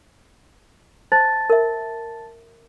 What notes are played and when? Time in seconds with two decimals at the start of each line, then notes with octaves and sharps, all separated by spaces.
1.12 C5 A5 A6
1.50 A#4 E5